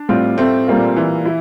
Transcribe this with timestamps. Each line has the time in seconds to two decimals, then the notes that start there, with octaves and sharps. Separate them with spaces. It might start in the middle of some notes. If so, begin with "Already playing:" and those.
Already playing: D4
0.09 A2 G3 C4 F4
0.38 A3 C4
0.67 A#2 G3 A#3 F4
0.96 E3
1.25 E4